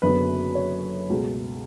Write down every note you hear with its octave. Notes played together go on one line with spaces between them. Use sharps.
F#1 F#2 D3 F#3 B3 B4
C#5
C#2 B2 A3